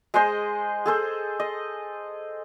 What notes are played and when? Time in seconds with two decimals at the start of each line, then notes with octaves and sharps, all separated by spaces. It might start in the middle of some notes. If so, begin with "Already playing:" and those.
0.14 G#3 G#4 C5 D#5
0.86 G#4 A4 C5
1.40 D#5